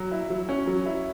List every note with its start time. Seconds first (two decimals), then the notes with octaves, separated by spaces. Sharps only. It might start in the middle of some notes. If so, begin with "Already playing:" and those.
Already playing: F#3
0.11 E4
0.30 F#3
0.49 C#4
0.67 F#3
0.86 E4